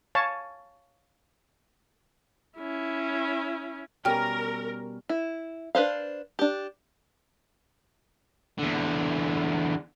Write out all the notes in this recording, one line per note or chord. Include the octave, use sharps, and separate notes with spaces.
C#5 F5 G#5 A5
C#4 E4
B2 G3 C#4 A#4 G5 F6
E4
D4 B4 C5 F5
D4 G4
E2 D3